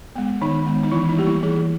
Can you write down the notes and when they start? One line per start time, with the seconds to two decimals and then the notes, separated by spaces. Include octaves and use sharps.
0.16 G#3 B3
0.41 D#3 D#4
0.66 G#3 B3
0.83 D#4
0.92 E3 E4
1.09 D#4
1.18 G3 A#3 G4
1.26 E4
1.43 E3 G#4